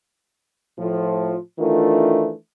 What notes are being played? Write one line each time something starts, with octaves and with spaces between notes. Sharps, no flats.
A2 F3
D#3 E3 A3 D4 F4